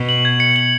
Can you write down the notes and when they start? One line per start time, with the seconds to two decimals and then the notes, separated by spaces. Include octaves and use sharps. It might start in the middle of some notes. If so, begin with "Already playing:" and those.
Already playing: B2
0.09 F#7
0.25 G#6
0.40 C#7
0.56 F#7